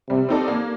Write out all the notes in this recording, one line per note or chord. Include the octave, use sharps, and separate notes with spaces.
C3 G3
C4 D#4 A4 D5
A#3